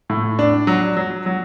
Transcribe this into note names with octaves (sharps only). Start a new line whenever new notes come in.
A2
D4
F#3
F#3
F#3